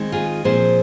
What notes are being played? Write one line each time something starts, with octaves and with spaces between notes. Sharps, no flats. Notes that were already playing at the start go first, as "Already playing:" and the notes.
Already playing: D#3 G#3 C4
F4 G#4
A#2 F3 C4 G#4 C5